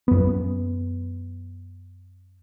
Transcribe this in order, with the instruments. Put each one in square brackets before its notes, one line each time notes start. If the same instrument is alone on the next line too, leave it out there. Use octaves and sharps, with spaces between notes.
[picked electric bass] F#2 B3